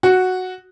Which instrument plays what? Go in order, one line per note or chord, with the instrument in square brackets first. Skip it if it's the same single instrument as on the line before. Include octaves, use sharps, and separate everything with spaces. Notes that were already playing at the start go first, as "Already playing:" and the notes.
[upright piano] F#4